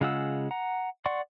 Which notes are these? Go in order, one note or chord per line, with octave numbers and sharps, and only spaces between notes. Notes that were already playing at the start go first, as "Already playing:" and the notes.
C#3 G#3 F4 F#5 E6
F#5 A#5
D5 F#5 C6 C#6